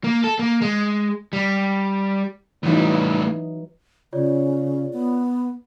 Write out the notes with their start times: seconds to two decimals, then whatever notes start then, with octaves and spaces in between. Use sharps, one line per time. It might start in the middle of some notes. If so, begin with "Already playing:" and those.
0.04 A#3
0.24 A4
0.39 A#3
0.62 G#3
1.33 G3
2.63 A2 E3 F#3 G3 D#4
4.13 C#3 F4 C#5 D5
4.93 B3